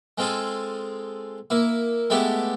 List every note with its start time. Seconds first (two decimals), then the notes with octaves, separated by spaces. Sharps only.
0.18 G#3 C4 F4 G#4 A4
1.50 A#3 E4
2.10 G#3 A3 B3 E4 G4 A4